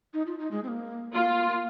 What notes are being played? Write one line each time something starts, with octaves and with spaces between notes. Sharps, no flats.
D#4
F4
D#4
G#3
C4
A#3
A#3 F4
A#3
A#3